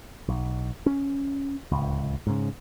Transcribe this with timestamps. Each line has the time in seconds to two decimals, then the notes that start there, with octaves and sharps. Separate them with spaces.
0.28 B1
0.86 C#4
1.72 D1 C#2
2.27 G#2 C#3